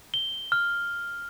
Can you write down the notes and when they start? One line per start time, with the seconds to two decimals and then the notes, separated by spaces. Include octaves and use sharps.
0.14 G7
0.52 F6